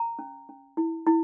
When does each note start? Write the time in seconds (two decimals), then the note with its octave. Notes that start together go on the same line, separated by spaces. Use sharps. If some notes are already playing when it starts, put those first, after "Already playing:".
Already playing: A#5
0.19 C#4
0.49 C#4
0.77 E4
1.07 E4